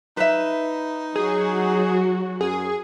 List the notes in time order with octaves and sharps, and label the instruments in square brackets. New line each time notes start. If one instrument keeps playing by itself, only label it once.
[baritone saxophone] D#4 [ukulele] B4 E5
[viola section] F#3 F#4 [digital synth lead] G#4
[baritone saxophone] F#2 [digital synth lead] G#4